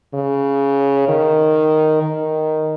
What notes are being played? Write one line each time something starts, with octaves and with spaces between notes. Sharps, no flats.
C#3
D#3
D#3